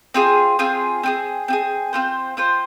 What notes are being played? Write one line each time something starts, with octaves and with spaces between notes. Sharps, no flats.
C4 F4 G#4
C4 F4 G#4
C4 F4 G#4
C4 F4 G#4
C4 F4 C5
C4 F4 C5